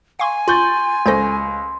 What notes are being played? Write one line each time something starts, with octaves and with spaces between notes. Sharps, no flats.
F5 G#5 C6 C#6
F4 C6 C#6 G6 A6
C#2 A4 C5 C#6 G6 A#6